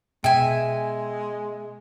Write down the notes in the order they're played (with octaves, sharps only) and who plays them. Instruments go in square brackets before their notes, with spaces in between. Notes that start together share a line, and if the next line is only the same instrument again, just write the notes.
[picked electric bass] B2 [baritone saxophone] G#3 [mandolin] E5 G#5 [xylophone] G5